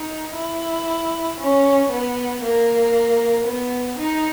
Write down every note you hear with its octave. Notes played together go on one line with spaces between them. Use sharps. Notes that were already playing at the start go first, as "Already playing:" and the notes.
Already playing: D#4
E4
C#4
B3
A#3
B3
D#4